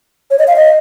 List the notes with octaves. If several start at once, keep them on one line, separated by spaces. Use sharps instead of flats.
C#5
D#5
F5
D#5